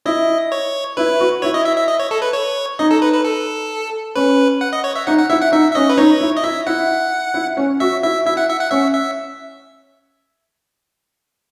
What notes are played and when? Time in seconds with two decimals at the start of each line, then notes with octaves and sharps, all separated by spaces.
0.05 E4 D#5
0.52 C#5
0.97 E4 B4
1.20 F#4
1.42 E4 C#5
1.54 D#5
1.65 E5
1.76 E5
1.88 D#5
1.99 C#5
2.11 A4
2.22 B4
2.33 C#5
2.79 D#4 D#5
2.91 A4
3.02 B4
3.13 B4
3.25 A4
4.16 C#4 B4
4.61 F#5
4.73 D#5
4.84 C#5
4.96 E5
5.07 D#4 F#5
5.18 F#5
5.30 E4 E5
5.41 F#5
5.52 D#4 E5
5.71 E5
5.75 C#4 D#5
5.89 B4
5.97 D#4 C#5
6.20 E4
6.37 D#5
6.43 E4 E5
6.67 E4 F#5
7.34 E4
7.57 C#4
7.80 F#4 E5
8.03 E4 E5
8.25 E4 E5
8.37 F#5
8.49 E5
8.60 F#5
8.71 C#4 E5
8.94 E5